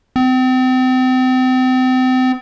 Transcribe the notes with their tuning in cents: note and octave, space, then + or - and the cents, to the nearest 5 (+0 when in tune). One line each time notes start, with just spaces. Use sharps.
C4 -35